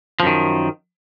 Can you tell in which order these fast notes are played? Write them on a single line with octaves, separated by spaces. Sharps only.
F3 F#2 D#3